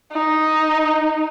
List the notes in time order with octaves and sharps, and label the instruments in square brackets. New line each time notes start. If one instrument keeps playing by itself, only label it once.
[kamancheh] D#4